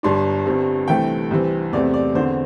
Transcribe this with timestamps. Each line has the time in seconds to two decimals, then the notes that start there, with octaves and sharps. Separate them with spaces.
0.03 G1 G2 G3 D4 C6
0.46 G1 G2 G3 C4
0.88 C2 C3 E3 A3 C4 G5
1.31 C2 C3 E3 C4
1.72 E2 C3 A3 C4 D5
1.94 D5
2.15 E2 D3 C4 C5